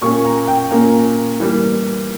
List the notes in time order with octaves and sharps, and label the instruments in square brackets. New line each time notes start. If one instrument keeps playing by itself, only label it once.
[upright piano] A#2 A#3 C#4 C#6
A#5
G5
A#2 A#3 C#4 A#5
E3 G3 A#3